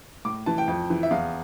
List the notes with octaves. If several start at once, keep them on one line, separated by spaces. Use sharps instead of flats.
A2 D6
E3 A5
G5
F2
E3
E5
E2 F5